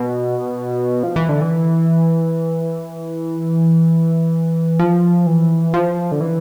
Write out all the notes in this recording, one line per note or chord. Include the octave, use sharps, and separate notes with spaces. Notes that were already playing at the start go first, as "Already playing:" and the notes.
Already playing: B2
F3
E3
D3
E3
F3
E3
F3
D3
E3